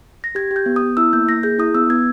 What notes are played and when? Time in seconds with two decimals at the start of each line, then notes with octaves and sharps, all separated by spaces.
0.24 A#6
0.35 G4 G#6
0.51 G4
0.56 G6
0.66 B3
0.76 D#6
0.82 B3
0.97 E4 E6
1.13 A#3 G6
1.28 A#3 A#6
1.43 G#4 G6
1.59 E4 D#6
1.74 B3 E6
1.90 B3 G#6